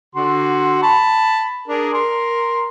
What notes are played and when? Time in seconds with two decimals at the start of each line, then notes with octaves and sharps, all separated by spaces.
0.15 D3 F#4 C6
0.83 A5 B5
1.68 D4 G#4 A#4
1.93 A#4 C6